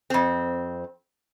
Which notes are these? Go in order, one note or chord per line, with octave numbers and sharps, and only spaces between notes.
F2 C4